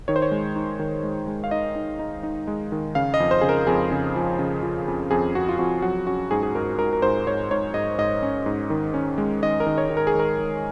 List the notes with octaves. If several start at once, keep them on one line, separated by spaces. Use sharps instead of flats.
D#3 C#5
C5
C#5
G#3
D#4
D#3
G#3
G#3
F5
D#4 D#5
D#4
D#4
D#4
G#3
D#3
C#3 F5
D#5
F2
C5
C#3 G#4
A#4
F2 G#4
C#3
F3
C#3
F3
F2
F2 G#4
F2 F#4
F4
F2 F#4
F#3 F#4
C#4 F#4
G#2 G#4
G#4
G#2 A#4
G#2 A#4
A#4
G#2 C5
G#2 C#5
G#2 C#5
G#2 D#5
G#2 D#5
C#4
G#2
D#3
C#4
G#3
D#3 D#5
A#4
D#3
C#5
D#3
A#4
G#4
D#3 A#4
D#3